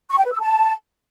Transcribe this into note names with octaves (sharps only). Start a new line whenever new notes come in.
C#6
G5
B4
E6
A5